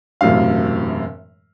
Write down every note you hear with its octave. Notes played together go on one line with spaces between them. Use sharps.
E1 F#2 A2 C3 F5